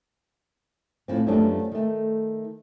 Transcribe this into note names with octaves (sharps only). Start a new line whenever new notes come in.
A2 F3 C4
F#2 F3 G3 A3 B3 D4
D#3 A3